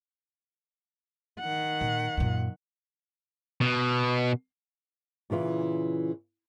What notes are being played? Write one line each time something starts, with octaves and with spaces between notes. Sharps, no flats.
D#3 F#5
A#2
F#2 A#2
B2
A#2 C#3 E3 F4